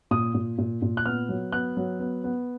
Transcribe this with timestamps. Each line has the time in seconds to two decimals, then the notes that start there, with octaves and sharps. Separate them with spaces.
0.11 A#2 D#6
0.34 A#2
0.58 A#2
0.82 A#2
0.97 F#6
1.05 B3 F6
1.29 F#3
1.52 B3 F#6
1.77 F#3
2.00 B3
2.24 B3